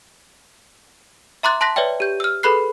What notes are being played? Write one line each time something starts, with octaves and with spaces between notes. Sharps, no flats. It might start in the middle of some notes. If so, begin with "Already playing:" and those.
E5 A#5 C6 D6 F#6 A6
A5 C6 F#6 A#6 B6
B4 C#5 D5 E5 G5
G4 G6
E6 F6
G#4 A4 B4 B5 F#6 C7